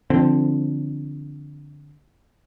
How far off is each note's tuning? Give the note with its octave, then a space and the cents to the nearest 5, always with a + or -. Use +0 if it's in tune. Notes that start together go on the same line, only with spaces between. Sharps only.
D3 -5 F3 -20 C4 +0